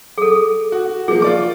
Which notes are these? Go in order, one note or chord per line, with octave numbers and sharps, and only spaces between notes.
G#4 A4
F#4
F3 A#3 G#4
F4 D5 D6